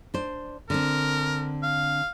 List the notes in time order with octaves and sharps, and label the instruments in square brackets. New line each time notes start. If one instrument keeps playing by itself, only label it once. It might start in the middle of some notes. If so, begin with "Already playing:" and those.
[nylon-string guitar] D4 C5
[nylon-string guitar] D3 C4 [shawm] A#4
[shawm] F5